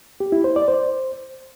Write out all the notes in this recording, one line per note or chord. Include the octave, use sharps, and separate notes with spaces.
G4
E4
C5
D5
C5